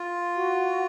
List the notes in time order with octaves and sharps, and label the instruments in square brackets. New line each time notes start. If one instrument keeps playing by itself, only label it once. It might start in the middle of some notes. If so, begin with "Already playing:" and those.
Already playing: [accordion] F4
[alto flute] F#4